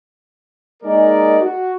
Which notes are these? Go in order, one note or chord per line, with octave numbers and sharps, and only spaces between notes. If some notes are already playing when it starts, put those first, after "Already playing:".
G#3 A#3 D#4 G#4 A#4 D5
F#4